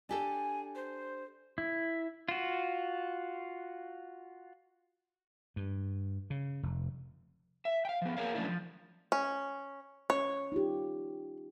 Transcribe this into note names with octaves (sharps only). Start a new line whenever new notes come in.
D4 G4 A4 G#5
C5
E4
F4 F#4
G2
C#3
F1
E5
F5 G5
F3 B3
A#3 G#4 A#4 C#5 F5
F#3 A3 B3 C#4 D4 E4
F3
C#4
C#4 C#5
D#4 F4 G4